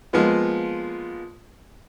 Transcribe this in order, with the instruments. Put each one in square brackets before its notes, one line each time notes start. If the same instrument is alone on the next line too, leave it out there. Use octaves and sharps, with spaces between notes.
[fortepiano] F3 G#3 A#3 B3 F4